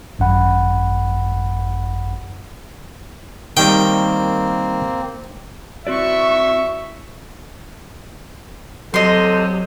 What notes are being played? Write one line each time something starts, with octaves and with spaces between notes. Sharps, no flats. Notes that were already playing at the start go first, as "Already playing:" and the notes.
G#1 F#2 F#5 B5
D#3 G3 A#3 C4 D#4 G5
E3 C4 F#4 D5 E5 C#6
C3 F#3 A4 D#5 C6